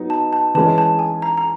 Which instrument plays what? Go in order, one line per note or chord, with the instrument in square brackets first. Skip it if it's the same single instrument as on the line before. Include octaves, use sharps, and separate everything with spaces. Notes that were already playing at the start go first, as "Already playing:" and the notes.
Already playing: [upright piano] F#3 B3 D#4
[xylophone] A5
A5
[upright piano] E3 G#3 C#4 [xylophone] A5
[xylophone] A5
G#5
A#5
A#5